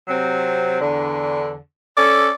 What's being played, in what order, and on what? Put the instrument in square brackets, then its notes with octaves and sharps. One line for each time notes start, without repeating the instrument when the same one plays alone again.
[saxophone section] C3 F#3 C4
E2 D3
[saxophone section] C#4 A4 [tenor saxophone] D5